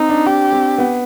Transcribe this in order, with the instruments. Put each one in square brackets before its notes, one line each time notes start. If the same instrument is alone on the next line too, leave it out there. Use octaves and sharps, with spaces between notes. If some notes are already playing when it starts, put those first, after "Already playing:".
Already playing: [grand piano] C4 [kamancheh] D#4
[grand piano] D4
[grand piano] D4 [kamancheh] G4
[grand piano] C4
B3